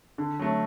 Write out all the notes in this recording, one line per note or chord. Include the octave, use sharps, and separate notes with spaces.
D3
F#3 A3